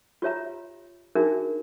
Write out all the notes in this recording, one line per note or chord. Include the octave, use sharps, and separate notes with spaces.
F4 G4 C#5 E5 A#5
D4 D#4 F#4 G#4 A#4 E5